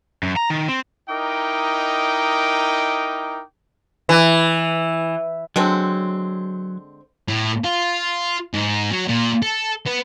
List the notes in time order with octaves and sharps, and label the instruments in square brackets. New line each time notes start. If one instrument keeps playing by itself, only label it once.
[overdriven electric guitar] F#2
A#5
D#3
C4
[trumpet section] D#4 E4 A#4 D#5 G5 D6
[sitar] E3
[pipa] D3 G#3 C4 [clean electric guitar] F#3
[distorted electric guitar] A2
F4
G#2
F#3
A#2
A4
B3